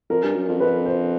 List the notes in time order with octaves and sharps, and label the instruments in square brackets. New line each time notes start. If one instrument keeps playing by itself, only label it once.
[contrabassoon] F2 [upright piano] A#4
[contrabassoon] G2
F#2
F2
[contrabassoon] F2 [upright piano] B4
[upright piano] C5